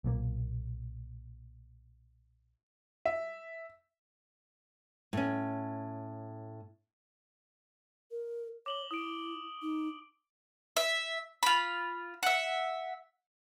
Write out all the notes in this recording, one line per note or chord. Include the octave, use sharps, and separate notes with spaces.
B1 A#2 D#3 A#3
E5
A2 C#4
A#4
C#5 D6 F#7 G7
E4 D#6 D7
D#4
E5
F4 B5
E5 F#5